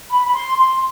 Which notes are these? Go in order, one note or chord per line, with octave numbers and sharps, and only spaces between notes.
B5
B5
C6
C6